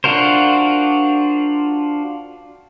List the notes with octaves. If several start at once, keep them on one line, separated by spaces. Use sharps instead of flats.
D4 F4 F#4 A#4 C5